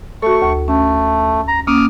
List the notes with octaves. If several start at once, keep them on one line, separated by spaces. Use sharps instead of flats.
A3 F#4 A4 C#6
D2
A3 C#4
A#5
A#3 C#4 D6 D#6 F6